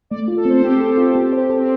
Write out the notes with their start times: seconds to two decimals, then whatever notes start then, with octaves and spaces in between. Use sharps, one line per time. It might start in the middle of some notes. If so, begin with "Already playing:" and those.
0.10 A3 D5
0.28 F4
0.37 A4
0.45 C4 C5
0.62 C4 G4
0.81 A4
0.97 F4
1.15 C4
1.33 C5
1.50 A4
1.58 C4